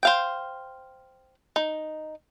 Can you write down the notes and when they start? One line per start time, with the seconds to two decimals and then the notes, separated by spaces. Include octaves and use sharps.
0.03 C5 F5 G5
1.56 D#4